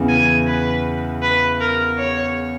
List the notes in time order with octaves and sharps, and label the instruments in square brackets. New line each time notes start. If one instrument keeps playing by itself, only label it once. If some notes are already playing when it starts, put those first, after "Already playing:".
Already playing: [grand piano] E2 C#3 E3
[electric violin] G#5
B4
B4
A#4
C#5